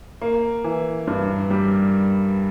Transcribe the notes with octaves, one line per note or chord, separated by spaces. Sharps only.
A#3
E3
G2
G3